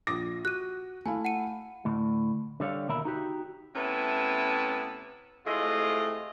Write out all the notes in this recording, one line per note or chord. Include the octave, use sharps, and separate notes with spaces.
A#1 D6 D#6 A#6
F#4 F#6 D#7
A3 E4 F5 G#5
F#5 C#7 D#7
D2 A2
D3 G3 C#5 F5
D#2 B2 A#4 E5 B5
D#4 F#4 G4
C3 A3 B3 C#4 E4 A5
A2 C3 G#3 A3 F4 D#5